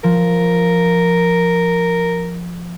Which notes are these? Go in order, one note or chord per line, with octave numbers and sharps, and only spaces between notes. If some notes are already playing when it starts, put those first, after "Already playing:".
F3 A#4